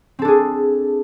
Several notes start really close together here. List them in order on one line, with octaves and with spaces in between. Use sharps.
C4 A4 D4 G#4